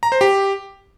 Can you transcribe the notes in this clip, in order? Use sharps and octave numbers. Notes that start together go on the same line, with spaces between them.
A#5
C5
G4